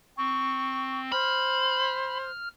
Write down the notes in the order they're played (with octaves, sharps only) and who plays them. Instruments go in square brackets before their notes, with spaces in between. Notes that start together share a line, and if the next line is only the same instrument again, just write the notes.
[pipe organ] C4 [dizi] C#6
[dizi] C5 [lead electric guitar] B5 [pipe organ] F6